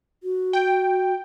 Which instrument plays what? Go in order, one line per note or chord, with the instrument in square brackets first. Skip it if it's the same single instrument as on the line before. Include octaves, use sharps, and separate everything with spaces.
[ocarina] F#4
[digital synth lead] G5